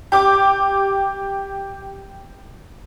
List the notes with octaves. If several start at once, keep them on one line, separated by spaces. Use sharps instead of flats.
G4 D6